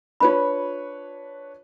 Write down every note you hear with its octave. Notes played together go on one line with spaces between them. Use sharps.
D4 F4 B4 C#5 B5